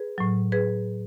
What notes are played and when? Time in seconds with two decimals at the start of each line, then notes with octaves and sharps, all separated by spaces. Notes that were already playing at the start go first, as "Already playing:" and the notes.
Already playing: G#4 B4
0.18 A2 F#3
0.52 G#4 B4